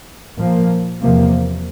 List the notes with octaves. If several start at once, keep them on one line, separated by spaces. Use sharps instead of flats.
A#2 F3 A#3
E2 C3 F3 A#3